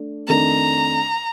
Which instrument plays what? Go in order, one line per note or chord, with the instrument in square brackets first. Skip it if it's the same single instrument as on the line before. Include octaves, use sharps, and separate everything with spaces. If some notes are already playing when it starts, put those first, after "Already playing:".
Already playing: [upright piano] A3 D4
[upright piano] F2 D#3 A3 D4 [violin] A#5